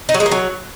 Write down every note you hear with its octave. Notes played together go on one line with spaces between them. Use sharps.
D#4
F#3
G#3
A#3
F#3